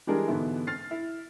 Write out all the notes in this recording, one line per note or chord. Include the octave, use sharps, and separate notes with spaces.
E3 G3 G#3 D4 G#4 A#4
G#2 B2 D3 E3 B3 E4
F6 A6 C7
E4